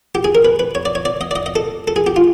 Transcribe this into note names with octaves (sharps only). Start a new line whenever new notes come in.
G4
G#4
A#4
B4
B4
C#5
D5
C#5
D5
D#5
D5
D#5
D#5
A4
A4
G#4
G4
F4